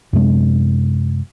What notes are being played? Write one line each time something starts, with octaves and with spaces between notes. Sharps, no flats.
F#2 C3 G#3 D4